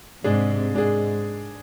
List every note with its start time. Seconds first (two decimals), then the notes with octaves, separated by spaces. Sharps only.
0.24 G#2 C3 G#3 D4 G#4
0.74 G#2 G#3 D4 G#4